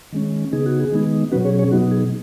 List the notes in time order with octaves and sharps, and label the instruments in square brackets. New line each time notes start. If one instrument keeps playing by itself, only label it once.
[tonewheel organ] D#3 G#3 C#4
C#3 B3 D#4 G#4
F#4
G#4
D#3 G#3 B3 D#4
B2 F#3 C#4 F#4 B4
G#4 C#5
G#4 C#5
B2 F#3 B3 D#4 F#4
G#4